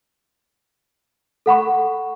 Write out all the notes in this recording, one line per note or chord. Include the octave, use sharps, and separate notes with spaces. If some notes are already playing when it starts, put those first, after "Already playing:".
A4 F#5 B5 C#6